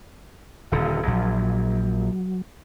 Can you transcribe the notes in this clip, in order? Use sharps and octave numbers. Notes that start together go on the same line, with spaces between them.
D#1 D3 F5
A#1 F#3